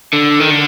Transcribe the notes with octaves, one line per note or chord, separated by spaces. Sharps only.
D3
D#3
D3